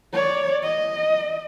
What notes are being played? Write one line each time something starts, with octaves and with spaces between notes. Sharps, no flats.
C#5 D5
D#5